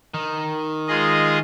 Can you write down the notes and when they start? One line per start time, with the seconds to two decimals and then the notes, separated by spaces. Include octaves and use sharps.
0.14 D#3
0.88 G#3 F4 G#4 D#5